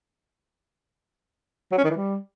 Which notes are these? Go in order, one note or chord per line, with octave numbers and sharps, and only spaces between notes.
F#3
C#4
D#3
E3
G3